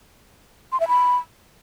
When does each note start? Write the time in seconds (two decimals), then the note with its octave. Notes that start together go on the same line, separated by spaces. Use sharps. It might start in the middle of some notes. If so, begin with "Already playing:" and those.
0.72 C6
0.80 E5
0.88 B5